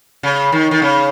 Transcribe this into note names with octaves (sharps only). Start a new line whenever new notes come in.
C#3
D#3
D#3
C#3